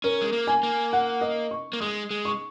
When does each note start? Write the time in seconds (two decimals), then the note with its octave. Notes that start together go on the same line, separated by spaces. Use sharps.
0.04 C#4 A#4
0.22 G#3
0.33 A#3
0.47 G#5
0.63 A#3
0.93 F#5
1.21 D#5
1.51 C#6
1.73 A#3
1.81 G#3 D#6
2.11 G#3
2.25 C#6